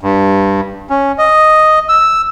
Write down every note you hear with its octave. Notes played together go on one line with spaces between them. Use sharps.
G2
C#4
D#5
E6